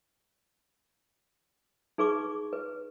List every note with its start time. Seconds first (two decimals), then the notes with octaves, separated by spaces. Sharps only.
1.98 D#4 G#4 B4 C#6 D6
2.53 B4